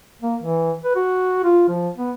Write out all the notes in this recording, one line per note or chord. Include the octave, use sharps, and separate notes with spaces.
A#3
E3
B4
F#4
F4
F3
B3